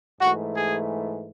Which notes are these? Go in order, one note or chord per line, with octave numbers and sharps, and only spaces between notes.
G#2 E3 A3 F#4
G#4